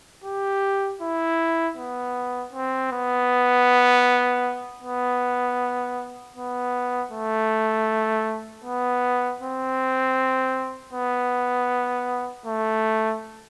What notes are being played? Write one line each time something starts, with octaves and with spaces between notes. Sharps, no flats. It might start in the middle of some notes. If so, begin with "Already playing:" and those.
G4
E4
B3
C4
B3
B3
B3
A3
B3
C4
B3
A3